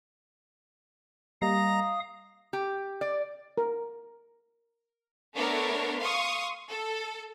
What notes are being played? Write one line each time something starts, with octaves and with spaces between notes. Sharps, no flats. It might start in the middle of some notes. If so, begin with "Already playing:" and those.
G3 A#3 D#5 F5 A#5 D#6
G4
D5
A#4
A3 B3 D4 A#4 C#5
F5 C6 C#6 D#6
A4